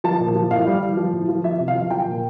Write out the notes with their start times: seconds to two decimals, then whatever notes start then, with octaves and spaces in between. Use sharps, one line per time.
0.04 F3 A5
0.20 A#2
0.35 F3
0.51 A2 F5
0.67 G3
0.82 E3
0.97 F3
1.13 A2
1.29 F3
1.44 F3 E5
1.60 C3
1.68 F5
1.75 F3
1.90 F3 G5
2.07 A#2